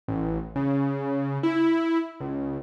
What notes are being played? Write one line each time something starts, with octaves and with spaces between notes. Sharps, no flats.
A1
C#3
E4
C#2